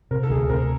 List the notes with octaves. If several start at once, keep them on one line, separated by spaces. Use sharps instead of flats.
C3 A#4
A4
D2 G#4
C3 A#4